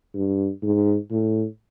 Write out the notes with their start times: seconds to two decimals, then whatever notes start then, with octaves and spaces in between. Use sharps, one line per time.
0.15 G2
0.63 G#2
1.11 A2